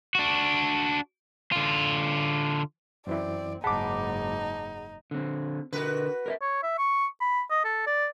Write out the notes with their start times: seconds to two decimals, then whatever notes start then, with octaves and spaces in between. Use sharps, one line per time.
0.15 D4 F#4
1.52 D3 F4
3.07 F#2 E3 C4 E4 D5
3.64 F#1 G#2 D#4 G#4 F#5 A5 B5 D6
5.11 D3 C4
5.73 D3 F#4 A#4 B4
6.26 A#4 D5 E5
6.41 C#5
6.63 E5
6.78 C#6
7.21 B5
7.50 D#5
7.65 A4
7.87 D5